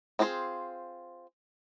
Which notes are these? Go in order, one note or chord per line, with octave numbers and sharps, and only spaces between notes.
C4 F4 G#4 A#4 C5